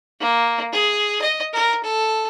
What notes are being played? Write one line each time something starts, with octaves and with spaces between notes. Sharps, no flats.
A#3
G#4
D#5
A#4
A4